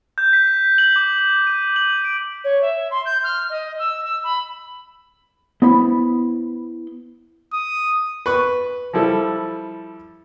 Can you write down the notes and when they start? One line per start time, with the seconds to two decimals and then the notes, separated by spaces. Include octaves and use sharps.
0.18 G6
0.33 B6
0.47 B6
0.78 F#7
0.96 D6
1.16 G6
1.47 D#7
1.76 F#7
2.04 D7
2.44 C#5
2.61 E5
2.91 C6
3.05 G6
3.23 F6
3.49 D#5
3.79 E6
4.04 E6
4.24 B5
5.62 B3 E4 C5 B5
7.53 D#6
8.26 B4 C#6
8.93 F3 G3 E4 A4